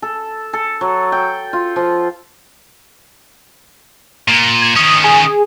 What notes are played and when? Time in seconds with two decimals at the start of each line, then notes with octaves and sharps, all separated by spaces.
0.02 A4
0.53 A4
0.81 F#3
1.12 G5
1.53 F4
1.76 F3
4.28 A#2
4.62 G#6
4.76 D#3 C#4 D#6
5.04 G#4